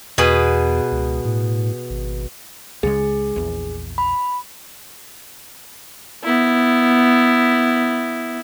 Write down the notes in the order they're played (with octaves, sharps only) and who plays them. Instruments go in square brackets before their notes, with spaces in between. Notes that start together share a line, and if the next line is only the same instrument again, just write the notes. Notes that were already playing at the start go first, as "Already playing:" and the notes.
[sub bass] E2 [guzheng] B2 G#4 B4
[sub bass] C#2
A2
G#1
[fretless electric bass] C#2 C#3 G#3 [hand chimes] G#4
[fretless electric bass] A#1 E2
[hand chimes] B5
[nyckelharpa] B3 E4